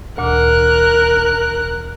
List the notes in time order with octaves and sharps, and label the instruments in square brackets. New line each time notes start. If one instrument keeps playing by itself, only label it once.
[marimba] D2 A#2 D#3 [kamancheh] A#4 F#6